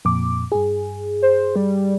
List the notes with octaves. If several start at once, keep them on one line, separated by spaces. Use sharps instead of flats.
F2 A#2 D6
G2 G#4
C5
G3